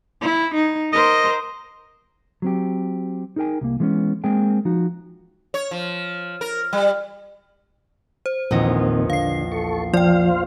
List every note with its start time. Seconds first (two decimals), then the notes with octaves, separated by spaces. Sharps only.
0.21 E4
0.54 D#4
0.93 A#4 C5 D#5
2.42 F#3 C4 G4
3.36 D#4 G#4 A#4 G5 G#5
3.61 C2 A#3
3.80 E3 G#3 A#3 B3 C#4
4.24 G#3 A#3 C4 G#4 G5
4.65 F3 D#4 F#4
5.54 C#5
5.71 F3
6.41 A#4
6.73 G3
8.26 C5
8.51 A#1 E2 A#2 D#3 C4 D#5
9.10 D3 F5 C7
9.52 A4 C#6
9.94 F3 F4 C5 D5 F5 G5